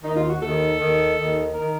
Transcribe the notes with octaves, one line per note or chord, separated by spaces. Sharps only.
D#2 D#3 D#4
F4
F#4
D#2 D#3 A4
D#2 D#3
D#2 D#3
D#3 A#4